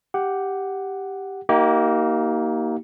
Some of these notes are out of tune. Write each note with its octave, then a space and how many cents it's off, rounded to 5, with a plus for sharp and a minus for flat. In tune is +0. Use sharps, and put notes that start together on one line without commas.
G4 +0 F#5 +5
A#3 +0 D#4 +25 G4 -35